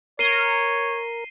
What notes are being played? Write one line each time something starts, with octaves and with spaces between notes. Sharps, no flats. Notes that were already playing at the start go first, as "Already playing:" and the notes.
A#4 C#5 C7 D#7 G7